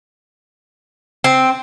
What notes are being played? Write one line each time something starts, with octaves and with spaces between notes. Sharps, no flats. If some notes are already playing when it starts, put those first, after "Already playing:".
C4